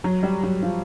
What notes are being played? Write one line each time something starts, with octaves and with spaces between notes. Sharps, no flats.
F#3
G3
F#3
F3